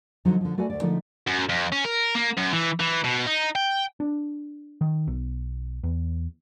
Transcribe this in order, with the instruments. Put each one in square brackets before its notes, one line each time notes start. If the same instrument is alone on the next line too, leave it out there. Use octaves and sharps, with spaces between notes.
[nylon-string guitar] D3 F3 F#3 D#4
D3 F3
A3 F#4 B4 D5 G#5
D2 D5
D3 F3 G#3 A3 D#4
[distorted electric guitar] F#2
F2
C#4
A#4
A#3
F#2
E3
E3
B2
D#4
G5
[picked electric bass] D4
D#3
B1
E2